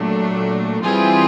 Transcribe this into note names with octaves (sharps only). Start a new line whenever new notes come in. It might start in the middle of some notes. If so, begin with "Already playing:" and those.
Already playing: A#2 F#3 A3 D4
E3 G3 C4 F4 G#4